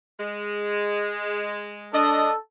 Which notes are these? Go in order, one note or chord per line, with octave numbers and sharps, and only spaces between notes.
G#3
D4 A4 D#5